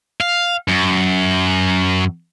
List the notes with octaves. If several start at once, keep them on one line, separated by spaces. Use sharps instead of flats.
F5
F#2